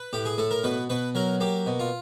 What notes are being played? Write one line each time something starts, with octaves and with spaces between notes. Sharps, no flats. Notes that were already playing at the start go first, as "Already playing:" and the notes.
Already playing: B4
A2 G4
G#4
A2 A4
A#4
B2 B4
B2 B4
F#3 A#4
A#3 G4
B2
F4